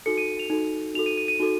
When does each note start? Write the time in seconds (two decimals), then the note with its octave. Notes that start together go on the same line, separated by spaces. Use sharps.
0.06 D#4 F#4 A4 C#7
0.18 D#7
0.39 F7
0.50 D#4 F#4 A4
0.94 D#4 F#4 A4 F7
1.06 D#7
1.17 D#7
1.28 D#7
1.40 D#4 F#4 A4